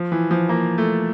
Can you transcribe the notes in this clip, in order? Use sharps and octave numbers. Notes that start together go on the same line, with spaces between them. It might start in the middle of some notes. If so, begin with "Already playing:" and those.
Already playing: F3
E3
F3
A#3
A3